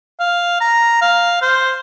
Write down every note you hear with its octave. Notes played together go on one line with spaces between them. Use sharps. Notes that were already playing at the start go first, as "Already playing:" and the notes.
F5
A#5
F5
C5